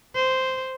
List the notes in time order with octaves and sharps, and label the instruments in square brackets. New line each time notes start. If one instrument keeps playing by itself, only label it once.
[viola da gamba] C5